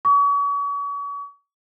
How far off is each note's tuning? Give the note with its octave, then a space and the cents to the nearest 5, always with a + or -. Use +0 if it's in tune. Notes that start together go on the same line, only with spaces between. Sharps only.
C#6 +40